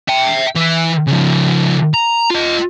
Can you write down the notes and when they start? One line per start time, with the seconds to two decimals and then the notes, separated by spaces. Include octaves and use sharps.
0.09 E5 G5
0.56 E3 E4
1.07 C#3 F3
1.94 A#5
2.31 F4 D#5